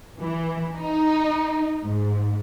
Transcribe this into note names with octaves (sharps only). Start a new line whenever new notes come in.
E3
D#4
G#2